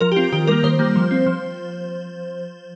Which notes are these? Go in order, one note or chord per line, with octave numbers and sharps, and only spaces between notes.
F3 A#4
G4
C4 F4
D#3 G4
G3 A#3 A#4
D#3 C5
G3 A#3
F3
C4
F3